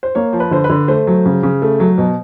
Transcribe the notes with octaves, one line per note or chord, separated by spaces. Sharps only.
C5
A#3 C#5
F3
B4
D3 C5
B4
D3
A3 C5
F#3
C#3
C#3
A3
F#3
B2